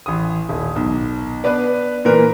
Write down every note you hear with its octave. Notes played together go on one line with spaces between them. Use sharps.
A1 D#6
D#1
B1
B3 D4 B4
A#2 E3 A#4 B4